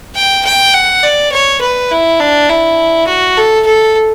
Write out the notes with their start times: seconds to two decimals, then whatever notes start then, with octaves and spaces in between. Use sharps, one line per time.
0.16 G5
0.45 G5
0.74 F#5
1.04 D5
1.32 C#5
1.62 B4
1.91 E4
2.20 D4
2.50 E4
3.07 F#4
3.37 A4
3.66 A4